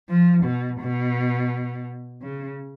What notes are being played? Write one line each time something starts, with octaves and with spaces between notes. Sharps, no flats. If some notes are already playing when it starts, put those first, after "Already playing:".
F3
B2
B2
C#3